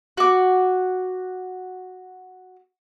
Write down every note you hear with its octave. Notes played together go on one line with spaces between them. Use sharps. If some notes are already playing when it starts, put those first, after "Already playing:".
F#4 D6